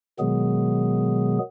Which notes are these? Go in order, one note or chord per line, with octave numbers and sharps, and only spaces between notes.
B2 D#3 F#3 G#3 B3 G#4